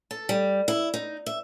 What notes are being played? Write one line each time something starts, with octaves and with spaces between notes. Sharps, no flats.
A4
G3
E4
D#4
E5